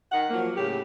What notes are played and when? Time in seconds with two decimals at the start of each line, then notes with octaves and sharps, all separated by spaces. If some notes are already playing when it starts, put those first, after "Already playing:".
0.11 D#3 F#5
0.29 F3 F#3 A#3
0.56 A2 C#3 G4